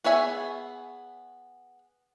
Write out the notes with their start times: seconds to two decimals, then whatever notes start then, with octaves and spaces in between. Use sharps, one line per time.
0.04 B3 G#4 C#5 E5 G#5